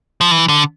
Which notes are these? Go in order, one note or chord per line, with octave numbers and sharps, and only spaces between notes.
F3
E3
D3